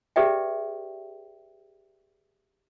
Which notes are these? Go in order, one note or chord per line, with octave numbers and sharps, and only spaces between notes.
G4 G#4 B4 D5 E5 G5